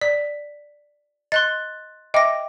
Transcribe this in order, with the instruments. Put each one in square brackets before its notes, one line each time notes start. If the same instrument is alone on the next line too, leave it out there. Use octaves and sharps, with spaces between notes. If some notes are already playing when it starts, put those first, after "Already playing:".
[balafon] D5 [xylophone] B6
[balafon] D#5 [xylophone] C6 F#6 A6
[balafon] D#5 E5 D6 [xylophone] G5 A#6